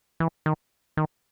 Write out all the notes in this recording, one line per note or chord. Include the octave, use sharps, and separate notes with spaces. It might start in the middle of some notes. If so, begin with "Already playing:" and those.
E3
D#3
D#3